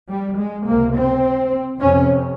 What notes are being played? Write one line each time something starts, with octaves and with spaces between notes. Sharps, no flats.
G3
G#3
C#2 C3 A#3
C4
F2 C3 C#4